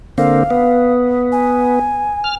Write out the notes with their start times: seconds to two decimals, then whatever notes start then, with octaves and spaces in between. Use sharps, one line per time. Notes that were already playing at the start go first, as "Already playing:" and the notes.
0.18 D3 A#3 C4 F5
0.50 B3
1.32 G#5
2.24 F6